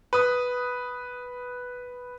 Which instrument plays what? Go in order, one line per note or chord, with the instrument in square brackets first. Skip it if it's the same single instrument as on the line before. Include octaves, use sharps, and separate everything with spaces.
[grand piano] B4 D#6